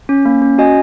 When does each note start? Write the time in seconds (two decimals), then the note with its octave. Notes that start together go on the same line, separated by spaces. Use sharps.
0.09 C#4
0.25 A#3
0.42 C#4
0.58 F#4 D#5 G#5